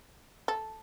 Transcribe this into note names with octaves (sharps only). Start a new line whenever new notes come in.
A4